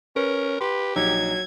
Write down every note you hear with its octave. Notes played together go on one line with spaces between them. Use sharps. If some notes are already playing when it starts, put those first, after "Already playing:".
C#4 A#4 B4
G4 B4 C6
A#1 F#3 D#4 E6 G#6